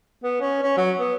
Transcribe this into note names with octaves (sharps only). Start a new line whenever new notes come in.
B3
C#4
C#4
F#3
B3